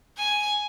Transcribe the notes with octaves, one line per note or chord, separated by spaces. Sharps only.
G#5